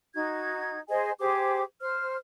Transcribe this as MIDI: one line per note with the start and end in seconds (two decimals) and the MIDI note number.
0.15 0.78 63
0.15 0.78 66
0.15 0.78 92
0.89 1.11 68
0.89 1.11 72
0.89 1.11 75
0.89 1.11 80
1.19 1.62 67
1.19 1.62 68
1.19 1.62 72
1.19 1.62 86
1.81 2.16 72
1.81 2.16 89